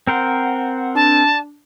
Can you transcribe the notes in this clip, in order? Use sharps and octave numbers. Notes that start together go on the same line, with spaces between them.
C4 A#4 C5 F#5
D4 A5